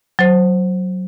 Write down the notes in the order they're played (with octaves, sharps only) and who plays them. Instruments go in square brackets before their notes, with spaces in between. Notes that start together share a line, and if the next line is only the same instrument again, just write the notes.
[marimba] F#3 C5